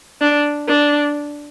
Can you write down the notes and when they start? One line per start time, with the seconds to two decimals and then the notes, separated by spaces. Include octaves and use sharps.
0.21 D4
0.68 D4